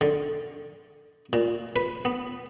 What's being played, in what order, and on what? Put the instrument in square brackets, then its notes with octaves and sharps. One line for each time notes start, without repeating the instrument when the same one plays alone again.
[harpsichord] D3
A#2
B4
B3